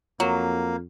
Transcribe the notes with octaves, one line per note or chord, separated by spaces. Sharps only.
F2 F#3 A#3